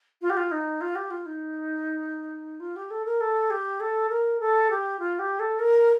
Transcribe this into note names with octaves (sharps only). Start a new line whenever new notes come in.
F4
G4
F4
D#4
F4
G4
F4
D#4
F4
G4
A4
A#4
A4
G4
A4
A#4
A4
G4
F4
G4
A4
A#4